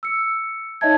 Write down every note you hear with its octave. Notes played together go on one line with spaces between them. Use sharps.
E6 C#7
D#4 C#5 D#5 E5 A5 G#6